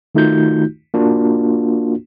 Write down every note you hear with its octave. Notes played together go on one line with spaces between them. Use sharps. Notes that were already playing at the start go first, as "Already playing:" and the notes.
D#3 A3 D#4 F4 F#4 G6
A#3 D4 F4 F#4